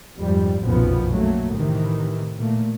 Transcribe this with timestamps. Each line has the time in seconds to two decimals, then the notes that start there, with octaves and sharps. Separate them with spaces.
0.19 F2 G#2 G3
0.62 F#1 B1 F2 A#2 F3 B3
1.13 F#3 A3 A#3
1.55 A2 C3 D#3 E3
2.39 A#2 A3 A#3